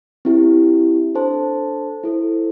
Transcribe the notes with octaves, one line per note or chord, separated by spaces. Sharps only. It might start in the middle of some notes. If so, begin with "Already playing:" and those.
C4 E4 G4
D4 A4 C5 A5
E4 A4 C5